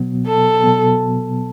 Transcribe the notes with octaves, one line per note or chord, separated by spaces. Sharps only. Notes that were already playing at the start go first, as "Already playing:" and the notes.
Already playing: B2 F#3 B3
A4
B2 F#3 B3